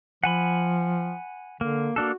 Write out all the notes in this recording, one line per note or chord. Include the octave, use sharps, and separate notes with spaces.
F3 F#5 G#5 B5
D3 A#3
A#3 D4 F#4 A4